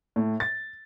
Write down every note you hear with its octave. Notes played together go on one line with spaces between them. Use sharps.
A2
A6